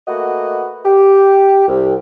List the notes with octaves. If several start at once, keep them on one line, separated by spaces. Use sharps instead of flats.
A3 A#3 F#4 B4 D#5 F#5
G4
C2